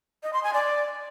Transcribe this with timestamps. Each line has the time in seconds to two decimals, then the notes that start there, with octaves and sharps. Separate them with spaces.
0.23 D#5
0.33 C6
0.43 G#5
0.54 D5